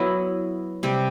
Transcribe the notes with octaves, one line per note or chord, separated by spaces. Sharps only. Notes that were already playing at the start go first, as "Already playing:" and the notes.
Already playing: F#3 B3 E4
C3 G3 C4